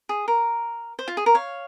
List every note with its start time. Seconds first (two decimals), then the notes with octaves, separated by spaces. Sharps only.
0.09 G#4
0.28 A#4
0.99 C5
1.08 F4
1.17 G#4
1.26 A#4
1.35 C#5 F5